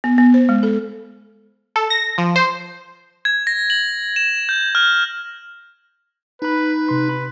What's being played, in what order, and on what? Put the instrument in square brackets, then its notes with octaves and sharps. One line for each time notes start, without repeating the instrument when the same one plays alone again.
[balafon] B3
B3
C5
G#3
A4
[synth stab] A4
A#6
F3
C5
[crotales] G#6
A#6
F#7
E7
G6
F6
[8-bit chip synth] D#4 B5 [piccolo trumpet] B4
[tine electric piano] C3 C6 [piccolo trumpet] B4